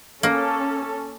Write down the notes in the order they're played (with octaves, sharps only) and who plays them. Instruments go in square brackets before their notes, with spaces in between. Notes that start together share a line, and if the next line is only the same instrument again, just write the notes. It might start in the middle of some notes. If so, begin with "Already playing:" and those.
[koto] A#3 [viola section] C#4 A4